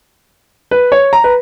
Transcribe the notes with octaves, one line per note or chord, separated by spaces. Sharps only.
B4
C#5
A#5
B4